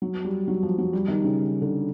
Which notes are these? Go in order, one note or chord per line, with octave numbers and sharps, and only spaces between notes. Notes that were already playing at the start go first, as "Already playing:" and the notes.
F#3
G3
F#3
F3
F#3
G3
D#3
C#3
D3